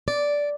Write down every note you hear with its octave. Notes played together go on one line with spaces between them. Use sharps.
D5